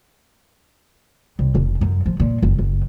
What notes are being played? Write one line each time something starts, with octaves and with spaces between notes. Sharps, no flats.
C2
F1
F#2
F3
A#2
F#1
F#1